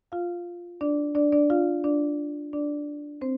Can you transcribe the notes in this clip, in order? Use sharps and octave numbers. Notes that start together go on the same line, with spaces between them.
F4 F5
D4 D5
D4 D5
D4 D5
F4 F5
D4 D5
D4 D5
C4 C5